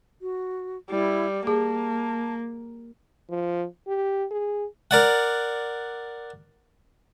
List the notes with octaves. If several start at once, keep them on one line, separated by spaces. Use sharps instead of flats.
F#4
G3 E4
A#3 G#4 A5
F3
G4
G#4
A#4 D5 F#5